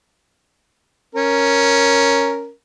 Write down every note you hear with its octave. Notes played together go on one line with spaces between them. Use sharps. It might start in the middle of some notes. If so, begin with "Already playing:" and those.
C#4 A#4